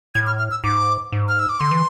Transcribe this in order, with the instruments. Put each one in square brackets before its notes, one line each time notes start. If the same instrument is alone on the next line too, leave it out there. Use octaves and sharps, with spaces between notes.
[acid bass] A2 [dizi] G#6
[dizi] F6
F6
E6
[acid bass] G#2 [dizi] D6
[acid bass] G#2
[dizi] F6
E6
D6
[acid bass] D3 [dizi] C6
[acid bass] E3